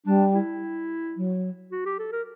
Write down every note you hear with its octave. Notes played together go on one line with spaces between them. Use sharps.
G3 D4
E4
F#3
F#4
G4
A4
A#4